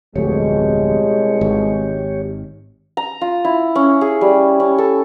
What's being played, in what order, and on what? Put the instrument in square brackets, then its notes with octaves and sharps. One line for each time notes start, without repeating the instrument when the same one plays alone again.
[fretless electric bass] D1 F2 A3 [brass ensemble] C2 B2 G#3 [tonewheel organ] G4 C#5
[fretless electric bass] G#1 D#3
[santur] A#5
F4
E4
C#4
G#4
G3
C#4
A4